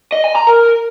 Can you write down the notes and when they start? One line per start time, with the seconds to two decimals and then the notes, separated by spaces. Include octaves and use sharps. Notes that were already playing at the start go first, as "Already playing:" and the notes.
0.12 D#5
0.24 G#5
0.35 A#5
0.47 A#4